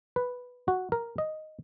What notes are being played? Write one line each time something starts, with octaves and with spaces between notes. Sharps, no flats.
B4
F#4
A#4
D#5